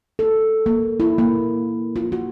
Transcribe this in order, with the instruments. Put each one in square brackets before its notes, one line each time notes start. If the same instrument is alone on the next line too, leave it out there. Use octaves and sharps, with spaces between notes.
[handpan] A4
A#3
E4
A#3
F4
F#4